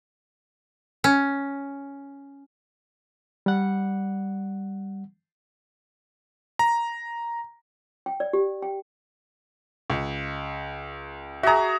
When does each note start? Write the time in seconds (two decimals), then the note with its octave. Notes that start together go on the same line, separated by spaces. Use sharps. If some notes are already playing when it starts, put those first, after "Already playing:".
1.04 C#4
3.46 G3 F#5
6.59 A#5
8.06 G5
8.20 D5
8.33 G4
8.62 G5
9.90 C#2
11.43 F#4 G#4 E5 A#5